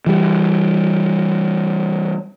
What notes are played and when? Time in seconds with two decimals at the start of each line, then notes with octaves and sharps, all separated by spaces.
0.06 E3 G3